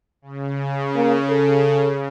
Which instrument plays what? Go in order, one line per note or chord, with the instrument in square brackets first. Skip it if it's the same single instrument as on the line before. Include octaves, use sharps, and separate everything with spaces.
[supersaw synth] C#3
[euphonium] A#3
A4